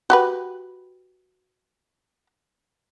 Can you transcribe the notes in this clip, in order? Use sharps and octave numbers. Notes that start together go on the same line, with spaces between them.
F#4 G4 B4